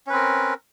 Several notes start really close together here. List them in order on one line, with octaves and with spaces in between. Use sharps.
C#4 B4 C4 A#4